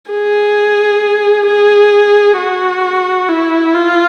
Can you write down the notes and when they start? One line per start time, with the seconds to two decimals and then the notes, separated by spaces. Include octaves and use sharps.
0.11 G#4
1.47 G#4
2.38 F#4
3.29 E4
3.74 F4